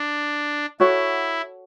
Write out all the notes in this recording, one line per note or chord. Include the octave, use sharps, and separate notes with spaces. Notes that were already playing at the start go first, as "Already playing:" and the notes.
Already playing: D4
E4 F#4 A4 C#5 F#5